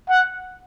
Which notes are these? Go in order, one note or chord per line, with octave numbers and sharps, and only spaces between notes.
F#5